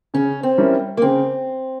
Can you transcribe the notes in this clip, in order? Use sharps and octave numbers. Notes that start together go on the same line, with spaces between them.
C#3 C#4
C4
G3 C#4 E4 A#4
A#3
C#3 C4